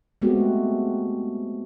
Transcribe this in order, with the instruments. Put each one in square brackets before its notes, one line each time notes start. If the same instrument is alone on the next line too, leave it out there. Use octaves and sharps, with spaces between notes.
[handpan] G#3 A3 B3 C4 F#4 G4